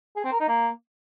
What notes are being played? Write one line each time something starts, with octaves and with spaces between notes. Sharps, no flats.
G#4
C4
A#4
D#4
A#3